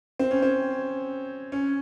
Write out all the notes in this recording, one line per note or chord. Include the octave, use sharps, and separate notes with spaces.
C4
C#4
C4
C#4